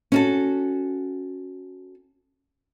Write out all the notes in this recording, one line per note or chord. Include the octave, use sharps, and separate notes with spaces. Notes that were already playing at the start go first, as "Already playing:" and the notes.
C#4 F#4 A4